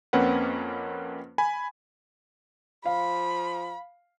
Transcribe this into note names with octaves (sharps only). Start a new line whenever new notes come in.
F2 A#3 C4 C#4 B4 F#5
G#5 B5
F3 F5 B5